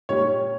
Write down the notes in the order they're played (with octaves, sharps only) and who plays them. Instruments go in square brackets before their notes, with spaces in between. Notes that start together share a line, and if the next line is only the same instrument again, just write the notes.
[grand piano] A#2 G3 C#4 C#5